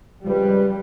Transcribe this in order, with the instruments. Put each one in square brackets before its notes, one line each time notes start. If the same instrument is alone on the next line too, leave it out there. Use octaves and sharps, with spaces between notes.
[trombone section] C#2 F3 B4 [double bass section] G3